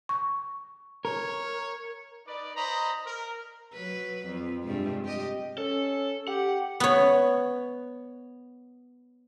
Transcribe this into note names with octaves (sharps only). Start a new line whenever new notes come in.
C#6
A#4 C#5
D#4 B4 D5
C5 D#5 A#5 B5
A#4
F#3 B4
F2
G2 C3 G#3
G4 D#5
C#4 A4
G4 F#5
B3 C#5